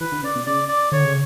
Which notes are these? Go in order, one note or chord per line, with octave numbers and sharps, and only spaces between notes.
E3 B4
D3
C#3 D5
B2
C#3 D5
D5
D3 C#5
C#3